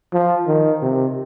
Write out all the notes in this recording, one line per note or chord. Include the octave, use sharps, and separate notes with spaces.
F3
D#3
C3